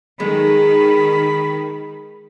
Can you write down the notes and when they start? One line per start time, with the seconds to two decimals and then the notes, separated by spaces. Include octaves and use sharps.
0.20 D#3 G#3 B5